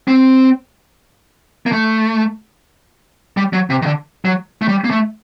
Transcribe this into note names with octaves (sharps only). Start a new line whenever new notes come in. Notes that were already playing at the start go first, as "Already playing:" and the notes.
C4
A#3
A3
G3
F#3
C3
D#3
D3
F#3
A3
G3
A#3
A3